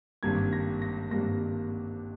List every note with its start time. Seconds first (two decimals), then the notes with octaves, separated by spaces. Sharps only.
0.23 G#1 G2 G3 A#3 G#6
0.53 A#6
0.82 A#6
1.11 G#1 G2 G3 A#3 A#6